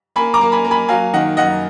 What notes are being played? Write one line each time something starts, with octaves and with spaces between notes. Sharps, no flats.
A#3 G#5 B5
A#5 D6
A#3
G#5 B5
A#3
G#5 B5
F#3 F5 G#5
D#3 D#5 F#5
F#2 D#5 F#5